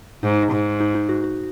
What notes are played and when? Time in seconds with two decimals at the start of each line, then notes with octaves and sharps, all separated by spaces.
0.23 G#2 D#4
0.52 G#2
0.80 D#4
0.95 D#4
1.09 F#4
1.24 F#4